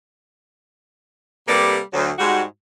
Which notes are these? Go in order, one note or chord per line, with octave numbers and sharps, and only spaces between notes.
C3 G3 A#3 A4 B4 D5
D2 F#3
G#2 G3 F#4